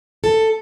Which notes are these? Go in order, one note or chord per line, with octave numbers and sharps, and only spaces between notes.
A4